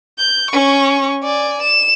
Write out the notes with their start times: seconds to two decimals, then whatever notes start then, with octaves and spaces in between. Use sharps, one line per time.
0.18 G6
0.50 C#4 C#6
1.23 D5 G#5
1.62 E7